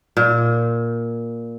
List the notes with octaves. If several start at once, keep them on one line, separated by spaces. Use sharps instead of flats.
A#2